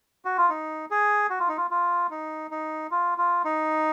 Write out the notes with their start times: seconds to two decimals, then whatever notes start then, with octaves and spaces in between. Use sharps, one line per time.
0.25 F#4
0.38 F4
0.49 D#4
0.91 G#4
1.30 F#4
1.40 F4
1.48 D#4
1.57 F4
1.71 F4
2.11 D#4
2.51 D#4
2.91 F4
3.18 F4
3.45 D#4